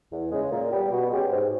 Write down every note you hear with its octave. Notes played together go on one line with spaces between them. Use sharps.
E2
C#3 G#3
A#2
G3 B3 G4
B2
G#3 C#4 G4
G#2